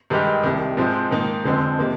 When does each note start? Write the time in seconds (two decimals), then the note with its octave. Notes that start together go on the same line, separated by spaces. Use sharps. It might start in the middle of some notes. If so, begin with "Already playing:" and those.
0.10 G2 D#3 G#3 D#4 G4
0.44 C2 C3 D#3
0.77 G#2 F3 G#3 C4
1.11 G#2 D#3 A#3 D#4
1.44 F2 D3 F3 G#3 C4
1.79 C3 D#3 A#3